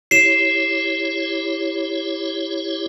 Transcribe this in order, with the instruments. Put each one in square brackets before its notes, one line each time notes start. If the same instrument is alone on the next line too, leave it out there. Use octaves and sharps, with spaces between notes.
[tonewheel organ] E4 G4 C#5 [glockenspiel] C7 E7